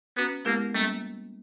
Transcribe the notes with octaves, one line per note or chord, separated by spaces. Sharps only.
B3 C#4 F#4 B4
G#3 A#3 B3 E4 G4 A#4
G3 A3 A#3 C#4